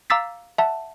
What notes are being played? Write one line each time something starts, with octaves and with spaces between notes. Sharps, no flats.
F5 A#5 D6 E6 A6 B6
E5 F#5 A5